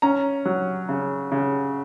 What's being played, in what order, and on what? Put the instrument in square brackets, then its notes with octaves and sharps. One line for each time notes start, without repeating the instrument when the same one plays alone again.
[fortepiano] C#4 A#5
F#3
C#3
C#3